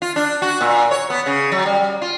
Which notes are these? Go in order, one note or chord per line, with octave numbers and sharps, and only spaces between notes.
F4
D4
F#4
A#2
C#5
B3
C#3
F#3
G3
F4